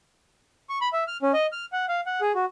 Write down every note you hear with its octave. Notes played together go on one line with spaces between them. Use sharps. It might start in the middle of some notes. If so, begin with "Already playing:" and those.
C#6
B5
E5
F6
C#4
D#5
F6
F#5
F5
F#5
G#4
F#4